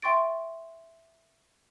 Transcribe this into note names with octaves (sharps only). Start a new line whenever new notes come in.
E5 G5 C6 C#6 A6 D7